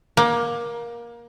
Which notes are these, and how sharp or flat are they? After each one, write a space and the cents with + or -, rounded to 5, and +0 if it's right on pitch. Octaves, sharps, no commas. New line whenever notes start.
A#3 +20